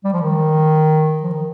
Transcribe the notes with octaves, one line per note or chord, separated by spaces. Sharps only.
G3
F3
D#3
F3
D#3